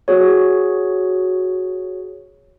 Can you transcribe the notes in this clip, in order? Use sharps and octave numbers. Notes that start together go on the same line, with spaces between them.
F#4 G#4 C#5